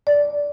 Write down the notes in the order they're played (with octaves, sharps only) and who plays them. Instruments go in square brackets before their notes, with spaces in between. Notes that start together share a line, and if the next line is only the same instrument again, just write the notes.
[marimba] D5